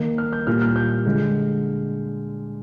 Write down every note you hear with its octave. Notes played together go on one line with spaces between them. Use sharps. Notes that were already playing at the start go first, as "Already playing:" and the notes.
Already playing: D#3 A#3
F6
G6
A#2 G3 A#3 F6
F6
G6
D3 G#3